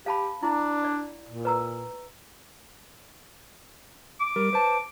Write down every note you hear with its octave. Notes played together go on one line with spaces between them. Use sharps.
G4 F5 A5 B5
D4 E4
D5
A#2
B4 A#5 E6
D6
G3 A#4
B4 C5 A5